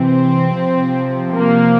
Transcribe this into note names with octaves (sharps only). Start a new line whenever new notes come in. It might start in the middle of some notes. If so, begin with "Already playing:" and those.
Already playing: C3 E3 C4
C3 F3
A#3